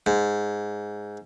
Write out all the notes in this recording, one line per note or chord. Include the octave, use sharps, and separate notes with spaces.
G#2